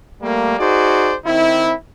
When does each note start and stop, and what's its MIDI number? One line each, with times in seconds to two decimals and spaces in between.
0.22 0.55 55
0.22 0.55 57
0.22 0.55 58
0.59 1.14 63
0.59 1.14 66
0.59 1.14 68
0.59 1.14 72
0.59 1.14 74
1.26 1.73 51
1.26 1.73 60
1.26 1.73 64